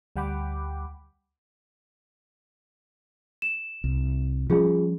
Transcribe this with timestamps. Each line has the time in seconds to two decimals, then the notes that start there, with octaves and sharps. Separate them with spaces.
0.16 D2 G3 F#5 G5 B5 D6
3.42 E7
3.84 C2
4.50 F3 G3 C#4 F4 G#4